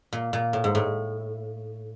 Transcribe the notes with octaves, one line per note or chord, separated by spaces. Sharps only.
A#2
A#2
A2
G#2
A2